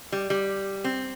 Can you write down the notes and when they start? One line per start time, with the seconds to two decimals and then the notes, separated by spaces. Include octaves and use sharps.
0.12 G3
0.30 G3
0.84 C4